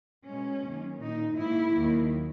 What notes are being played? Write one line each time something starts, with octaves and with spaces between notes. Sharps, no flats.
B2 G#3 C#4
F#2 D#3 A#3
A#2 A#3 D#4
G#2 D#3 A#3 E4
D#2 D#3 F#3 A#3